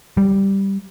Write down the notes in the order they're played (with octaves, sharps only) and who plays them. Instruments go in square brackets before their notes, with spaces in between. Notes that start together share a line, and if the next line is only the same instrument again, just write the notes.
[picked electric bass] G3